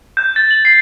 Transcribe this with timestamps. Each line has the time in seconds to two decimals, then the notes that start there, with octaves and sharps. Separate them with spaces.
0.17 G6
0.36 A6
0.51 F#7
0.65 C7